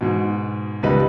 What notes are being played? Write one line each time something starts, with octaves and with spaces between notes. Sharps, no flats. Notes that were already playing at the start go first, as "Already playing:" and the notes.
G#2 B2
C#2 G3 D#4 B4